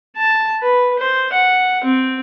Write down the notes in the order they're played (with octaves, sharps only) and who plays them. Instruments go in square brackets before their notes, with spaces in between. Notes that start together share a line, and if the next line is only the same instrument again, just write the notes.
[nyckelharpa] A5
B4
C5
F#5
C4